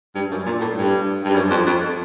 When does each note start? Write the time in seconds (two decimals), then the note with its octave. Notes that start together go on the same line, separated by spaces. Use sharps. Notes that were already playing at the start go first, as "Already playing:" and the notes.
0.15 G2
0.31 F#2
0.46 A#2
0.61 A2
0.76 G2
1.25 G2
1.36 F#2
1.51 F2
1.66 F2